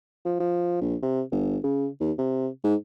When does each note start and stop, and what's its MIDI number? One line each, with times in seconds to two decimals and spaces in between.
0.25 0.36 53
0.40 0.78 53
0.81 0.96 34
1.02 1.22 48
1.31 1.57 31
1.64 1.87 49
2.00 2.11 39
2.18 2.47 48
2.64 2.75 44